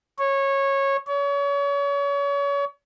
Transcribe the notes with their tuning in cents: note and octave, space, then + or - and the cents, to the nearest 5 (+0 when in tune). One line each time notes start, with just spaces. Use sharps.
C#5 -15
C#5 +35